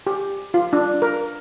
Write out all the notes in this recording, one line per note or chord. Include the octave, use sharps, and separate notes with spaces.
G4
F4
D4
A#4